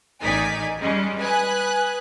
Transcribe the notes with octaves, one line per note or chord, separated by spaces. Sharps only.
A1 D#3 D#4 D5 G#5 B6
G3 G#3 C#4
B4 G#5 D#6 F#6